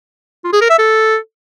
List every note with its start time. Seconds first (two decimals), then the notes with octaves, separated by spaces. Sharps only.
0.44 F4
0.53 G#4
0.61 A#4
0.70 E5
0.78 A4